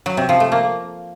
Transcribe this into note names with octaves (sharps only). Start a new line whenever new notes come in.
F#3
C3
F3
A3
A#3